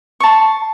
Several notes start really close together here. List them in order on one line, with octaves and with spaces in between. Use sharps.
C#6 A5 C6